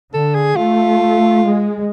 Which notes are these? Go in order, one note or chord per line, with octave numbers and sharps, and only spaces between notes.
D3 A4
G#4
A3 F4
G#3